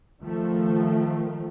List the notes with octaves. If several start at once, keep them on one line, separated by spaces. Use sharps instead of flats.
D#3 F3 A3